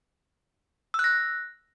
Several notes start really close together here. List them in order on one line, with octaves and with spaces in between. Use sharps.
E6 F#6 A#6